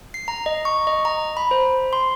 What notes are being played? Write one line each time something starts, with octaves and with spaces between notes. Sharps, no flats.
C7
A#5
D#5
C#6
D#5
A#5
B5
C5
C6